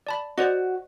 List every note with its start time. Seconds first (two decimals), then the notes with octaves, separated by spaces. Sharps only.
0.07 D5 A5 B5
0.38 F#4 C5 D5 D#5